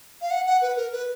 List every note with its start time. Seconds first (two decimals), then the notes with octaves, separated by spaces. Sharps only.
0.21 F5
0.31 F#5
0.46 F#5
0.61 B4
0.77 A#4
0.92 B4